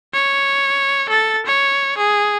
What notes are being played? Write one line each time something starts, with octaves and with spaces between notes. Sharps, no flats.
C#5
A4 A6
C#5
G#4